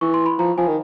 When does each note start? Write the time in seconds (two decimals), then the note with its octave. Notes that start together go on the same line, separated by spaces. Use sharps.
0.01 E3 C#6
0.14 C6
0.26 B5
0.38 F3 A#5
0.57 F3 G#5
0.67 D#3